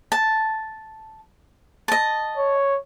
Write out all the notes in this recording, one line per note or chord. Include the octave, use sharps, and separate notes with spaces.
A5
D#5 A5
C#5